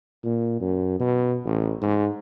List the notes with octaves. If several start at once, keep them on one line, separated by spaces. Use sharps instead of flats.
A#2
F#2
B2
A1
G#2